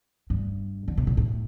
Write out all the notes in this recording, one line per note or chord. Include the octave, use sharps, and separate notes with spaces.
G2
D3
C3
A#2
A2